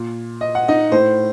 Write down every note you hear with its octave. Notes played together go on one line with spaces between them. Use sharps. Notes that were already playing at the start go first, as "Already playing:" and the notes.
Already playing: A#2
D#5
F#5
D#4 D#5
A2 C5